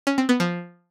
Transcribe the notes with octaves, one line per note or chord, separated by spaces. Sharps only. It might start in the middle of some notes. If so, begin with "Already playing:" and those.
C#4
C4
B3
F3